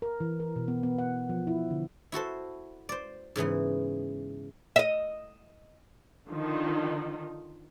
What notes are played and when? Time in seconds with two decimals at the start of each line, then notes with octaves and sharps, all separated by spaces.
0.02 A#4
0.20 E3
0.40 A#4
0.56 B2
0.68 B3
0.83 B3
0.99 F#5
1.29 F3
1.47 E4
1.70 D3
2.12 E4 F#4 A4 C5
2.89 C5 D5
3.36 G#2 C#3 E3 B3
4.76 D#5 E5
6.28 D3 D#3 F3 D#4